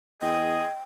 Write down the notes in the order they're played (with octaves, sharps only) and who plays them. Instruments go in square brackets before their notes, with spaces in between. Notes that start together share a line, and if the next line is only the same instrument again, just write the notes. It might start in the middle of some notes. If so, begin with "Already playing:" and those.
[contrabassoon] E2 [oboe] G#4 [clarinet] D#5 [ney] G5